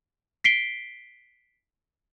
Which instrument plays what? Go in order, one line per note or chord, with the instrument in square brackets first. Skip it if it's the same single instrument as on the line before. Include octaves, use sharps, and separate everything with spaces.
[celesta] B6 C7 D7 G7